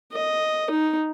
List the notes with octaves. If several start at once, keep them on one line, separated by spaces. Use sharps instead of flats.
D#5
D#4